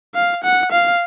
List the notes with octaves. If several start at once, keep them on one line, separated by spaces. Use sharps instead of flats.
F5
F#5
F5